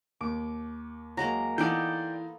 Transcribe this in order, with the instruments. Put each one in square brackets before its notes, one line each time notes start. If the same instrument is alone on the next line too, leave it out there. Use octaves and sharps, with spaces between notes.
[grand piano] D#2 [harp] D6
[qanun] F#3 G#3 A#3 [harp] A#5
[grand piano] E3 D#4 A5 [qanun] B3 F4 A4 [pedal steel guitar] D5 G5